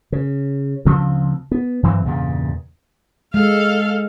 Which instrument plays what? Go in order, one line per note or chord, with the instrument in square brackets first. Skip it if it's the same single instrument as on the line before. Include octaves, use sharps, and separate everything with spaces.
[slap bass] C#3
D2 C#3 F3 C4
B3
G2 E3 F#3 C4
E2 G2 A#2 C#3
[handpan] G#3 [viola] A4 F5